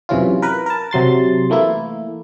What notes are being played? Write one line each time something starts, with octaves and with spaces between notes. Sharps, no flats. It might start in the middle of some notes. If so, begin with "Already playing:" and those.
F#2 C3 E3 C#4 F4
A#4 B4
A#4 A5
C3 F#3 C6 A6
E3 A3 A#3 E4